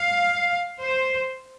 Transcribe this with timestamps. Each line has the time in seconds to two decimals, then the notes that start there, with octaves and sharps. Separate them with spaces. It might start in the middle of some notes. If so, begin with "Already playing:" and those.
Already playing: F5
0.82 C5